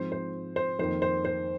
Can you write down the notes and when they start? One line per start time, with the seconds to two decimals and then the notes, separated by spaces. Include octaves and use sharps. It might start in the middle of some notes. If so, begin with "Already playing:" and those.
Already playing: G#2 F3 C4 C5
0.12 C5
0.56 C5
0.79 F2 D#3 A#3 C5
1.02 C5
1.25 C5